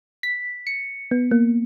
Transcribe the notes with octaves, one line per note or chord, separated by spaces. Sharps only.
B6
C#7
B3
A#3